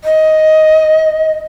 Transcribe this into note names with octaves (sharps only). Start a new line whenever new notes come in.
D#5